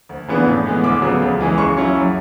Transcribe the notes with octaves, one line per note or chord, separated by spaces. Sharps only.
D2
C#3 E3 B3 D4
A2
E3 G#3 B3
D2 D6
C#3 F#3 B3
C#2
C#3 E3 G#3
C#3 C#6
F#3 C#4 E4
F#2